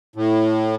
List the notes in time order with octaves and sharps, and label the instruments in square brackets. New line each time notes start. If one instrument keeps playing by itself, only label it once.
[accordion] A2